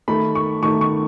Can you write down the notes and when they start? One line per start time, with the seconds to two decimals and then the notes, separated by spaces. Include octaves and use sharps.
0.08 D#3 A3 B5
0.35 C#6
0.62 D#3 A3 C#6
0.81 C#6